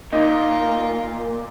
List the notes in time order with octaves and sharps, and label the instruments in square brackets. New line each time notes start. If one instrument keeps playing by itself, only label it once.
[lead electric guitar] A#2 [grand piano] D#4 [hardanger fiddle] F4 A#4